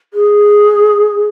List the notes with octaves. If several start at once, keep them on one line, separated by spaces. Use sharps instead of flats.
G#4